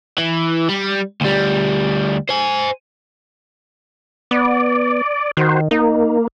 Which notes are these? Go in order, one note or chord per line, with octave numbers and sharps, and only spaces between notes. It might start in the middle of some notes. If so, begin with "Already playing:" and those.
E3
G3
D2 G3
C5 G#5
B3 D5
D#3 F#4 C5
A#3 D#4